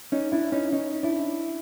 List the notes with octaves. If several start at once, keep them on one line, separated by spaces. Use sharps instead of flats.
C#4 D#4
D4 E4
C#4 D#4
C#4 D#4
D4 E4